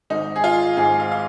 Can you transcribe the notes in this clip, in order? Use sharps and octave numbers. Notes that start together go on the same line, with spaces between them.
G#1 G#2 D#3 D#4
G#4
F4
G#1 G#2 D#3 G#4
F5
F5